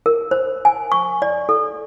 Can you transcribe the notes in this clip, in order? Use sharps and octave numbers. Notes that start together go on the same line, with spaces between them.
A#4
C5
G#5
C#6
D5
A4